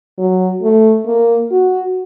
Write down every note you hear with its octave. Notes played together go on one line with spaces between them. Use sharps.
F#3
A3
A#3
F#4